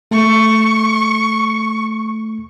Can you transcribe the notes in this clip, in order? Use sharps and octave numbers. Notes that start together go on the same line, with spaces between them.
A3 C#6